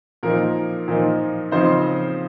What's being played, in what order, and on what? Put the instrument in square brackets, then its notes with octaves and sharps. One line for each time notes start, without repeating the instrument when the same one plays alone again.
[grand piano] A#2 F3 A#3 D#4 A#4
A#2 F3 A#3 D#4
C#3 F3 C4 D#4 C5